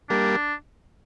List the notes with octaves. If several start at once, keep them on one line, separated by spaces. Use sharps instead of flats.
G3 A#3 D4